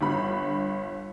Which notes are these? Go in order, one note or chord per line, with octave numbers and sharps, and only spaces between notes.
G1 D3 B5